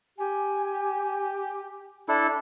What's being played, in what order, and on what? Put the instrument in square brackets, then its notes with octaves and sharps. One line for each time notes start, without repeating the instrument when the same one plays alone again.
[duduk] G4 [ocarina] G#5
[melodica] D4 E4 A4